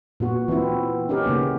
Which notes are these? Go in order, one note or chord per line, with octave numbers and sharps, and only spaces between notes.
A#2 B3 F#4
E3 B3 C4 E4
C#4 D#4 G4 A#4
C#3 A#3 B3